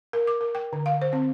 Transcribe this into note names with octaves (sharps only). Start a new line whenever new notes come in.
A#4
D6
A#4
G5
D3
F5
C5
C4